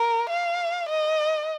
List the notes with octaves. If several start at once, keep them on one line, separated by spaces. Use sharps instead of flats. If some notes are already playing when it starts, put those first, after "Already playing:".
Already playing: A#4
F5
D#5